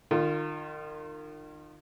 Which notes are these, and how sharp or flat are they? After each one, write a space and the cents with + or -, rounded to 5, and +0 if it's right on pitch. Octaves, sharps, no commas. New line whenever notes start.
D#3 -35 F4 +0